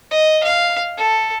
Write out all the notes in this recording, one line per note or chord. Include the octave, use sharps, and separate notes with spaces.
D#5
F5
A4